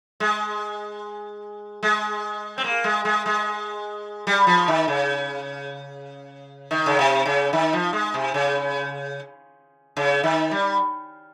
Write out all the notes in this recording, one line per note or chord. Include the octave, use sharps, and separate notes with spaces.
G#3
G#3
C4
A#3
G#3
G#3
G#3
G3
F3
D#3
C#3
D#3
C#3
C3
C#3
D#3
F3
G#3
C3
C#3
C#3
D#3
G3